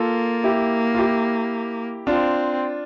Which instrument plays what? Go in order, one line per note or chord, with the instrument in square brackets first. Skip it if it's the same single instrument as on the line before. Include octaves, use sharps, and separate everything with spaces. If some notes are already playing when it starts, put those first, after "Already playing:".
Already playing: [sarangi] A#3 [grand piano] F4 A4
[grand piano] E4 G4
F4
E4 G4
[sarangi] C4 [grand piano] D4 F4